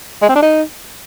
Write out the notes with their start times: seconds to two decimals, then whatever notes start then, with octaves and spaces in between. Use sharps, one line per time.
0.22 G#3
0.29 C4
0.35 D4
0.42 D#4